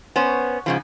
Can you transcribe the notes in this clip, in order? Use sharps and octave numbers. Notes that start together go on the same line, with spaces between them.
B3 C#4 C5
G#2 C#3 F3